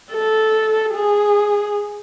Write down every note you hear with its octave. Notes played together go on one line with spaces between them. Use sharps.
A4
G#4